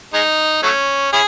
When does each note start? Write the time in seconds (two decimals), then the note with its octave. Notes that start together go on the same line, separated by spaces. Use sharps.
0.14 G#3 D#4
0.63 F#3 A3 C#4
1.13 C#4 E4 G#4